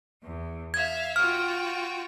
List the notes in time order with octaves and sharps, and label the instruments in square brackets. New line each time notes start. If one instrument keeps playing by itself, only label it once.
[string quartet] E2
[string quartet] E5 F5 [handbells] G#6
[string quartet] F4 F#4 G5 [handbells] F6